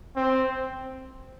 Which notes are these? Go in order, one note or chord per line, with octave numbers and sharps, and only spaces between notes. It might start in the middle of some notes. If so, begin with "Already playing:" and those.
C4